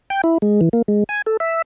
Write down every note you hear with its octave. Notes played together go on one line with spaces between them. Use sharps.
G5
E4
G#3
E3
A#3
G#3
G#5
A4
E5